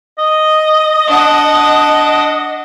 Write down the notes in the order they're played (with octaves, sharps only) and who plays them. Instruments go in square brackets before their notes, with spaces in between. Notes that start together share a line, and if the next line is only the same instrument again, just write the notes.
[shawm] D#5
[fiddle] D4 F#5